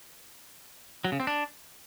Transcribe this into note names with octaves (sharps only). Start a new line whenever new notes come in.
F#3
C#3
C4
D4